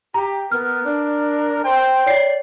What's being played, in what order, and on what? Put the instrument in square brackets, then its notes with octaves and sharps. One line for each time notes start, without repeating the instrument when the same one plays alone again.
[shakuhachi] G4 [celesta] A#5
[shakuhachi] B3 [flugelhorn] A#4 [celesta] F6
[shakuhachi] D4
[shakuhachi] C5 [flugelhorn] G5
[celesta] C#5 C7 [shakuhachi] D5